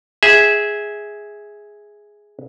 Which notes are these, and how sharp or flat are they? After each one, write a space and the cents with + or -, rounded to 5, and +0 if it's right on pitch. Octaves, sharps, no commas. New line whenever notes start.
G#4 +0 E5 -15